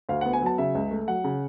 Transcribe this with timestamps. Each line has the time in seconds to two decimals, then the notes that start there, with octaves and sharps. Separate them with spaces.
0.09 D2 F5
0.21 F#5
0.26 B3
0.33 G#5
0.42 F#3 A5
0.58 C#3 E5
0.75 C#2
0.91 A3
1.07 F#3 F#5
1.24 C#3